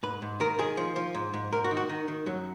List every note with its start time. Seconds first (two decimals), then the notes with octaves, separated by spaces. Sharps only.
0.03 G#2 B4
0.22 G#2
0.40 D#3 A#4
0.59 D#3 G#4
0.77 F3
0.96 F3
1.14 G#2
1.34 G#2
1.52 G#2 A#4
1.64 F#4
1.71 D#3
1.77 F#4
1.89 D#3 D#4
2.08 D#3
2.26 F#2 F#3